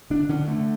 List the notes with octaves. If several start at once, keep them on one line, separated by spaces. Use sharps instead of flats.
D3 D4
D3 C#4
D3 A3